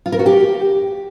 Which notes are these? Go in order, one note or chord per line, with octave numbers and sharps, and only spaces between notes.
F4
A#4
F#4
G4